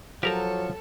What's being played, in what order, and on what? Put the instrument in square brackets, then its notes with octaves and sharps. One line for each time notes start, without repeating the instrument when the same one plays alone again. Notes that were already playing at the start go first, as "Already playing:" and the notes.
[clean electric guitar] F3 [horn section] F#3 [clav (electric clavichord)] G4 A#4 A#5 [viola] A4